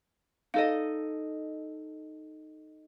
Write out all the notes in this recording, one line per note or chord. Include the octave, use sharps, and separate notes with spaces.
D#4 A4 D#5 F5